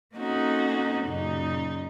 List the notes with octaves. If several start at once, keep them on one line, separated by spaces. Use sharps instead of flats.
A#3 C4 C#4 D#4 F#4 A4
F#2 A#2 C#3 D#4